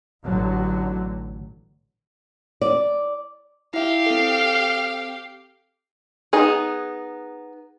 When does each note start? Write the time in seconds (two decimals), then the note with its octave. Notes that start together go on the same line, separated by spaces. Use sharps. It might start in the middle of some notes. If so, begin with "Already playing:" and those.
0.25 A1 A2 D3 F#3
2.61 D5
3.74 E4 G4 E5 F5
4.06 C4 A4
6.33 B3 D#4 G#4